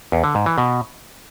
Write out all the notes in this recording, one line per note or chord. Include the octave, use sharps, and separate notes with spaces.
E2
D3
G#2
E3
B2